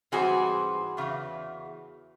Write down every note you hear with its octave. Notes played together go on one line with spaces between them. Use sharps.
G#2 E3 G3 C4 F#4 G#4
E2 C#3 E3